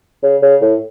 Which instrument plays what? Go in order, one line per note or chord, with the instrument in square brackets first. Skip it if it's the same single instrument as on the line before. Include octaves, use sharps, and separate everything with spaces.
[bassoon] C#3
C#3
A2